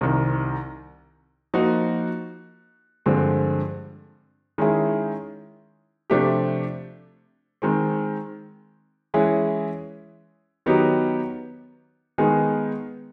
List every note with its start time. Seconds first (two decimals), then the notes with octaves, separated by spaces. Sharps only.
0.01 C2 C3 D#3
1.54 F3 A#3 D#4 F#4
3.06 G2 D3 F3 G#3 C4
4.58 D#3 G#3 C#4 E4 G#4
6.10 C3 F3 A3 D4 G4
7.62 D#3 G#3 C4
9.14 E3 G#3 C#4 E4 G#4
10.66 D#3 F#3 B3 D#4 G4
12.18 D#3 G#3 B3 D#4 G#4